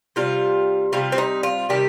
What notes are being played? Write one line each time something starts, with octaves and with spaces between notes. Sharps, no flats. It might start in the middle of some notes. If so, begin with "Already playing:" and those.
C3 G3 F4
C3 G3 F4
C4
D#4
F4
C3 D#3 G3 G4